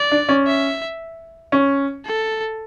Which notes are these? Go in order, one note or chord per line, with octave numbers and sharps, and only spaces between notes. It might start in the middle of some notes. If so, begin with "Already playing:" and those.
Already playing: D5
D4
C#4
E5
C#4
A4